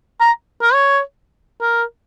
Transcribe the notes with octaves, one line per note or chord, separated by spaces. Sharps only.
A#5
A#4
C#5
A#4